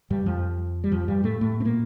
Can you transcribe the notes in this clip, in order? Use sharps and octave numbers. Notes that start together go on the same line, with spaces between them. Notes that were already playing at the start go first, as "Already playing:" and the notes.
G2 G3
F2 F3
G3
F2 F3
G2 G3
A2 A3
A2 A3
C4
A#2 A#3